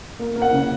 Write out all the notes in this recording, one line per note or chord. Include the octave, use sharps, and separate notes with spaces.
A#3
A#3
F#5
C#3